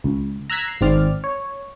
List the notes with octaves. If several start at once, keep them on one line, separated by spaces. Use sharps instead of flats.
C#2
A#5 E6 F#6 G#6 B6
C7
G#1 G#2 C4 D5 F6
C#5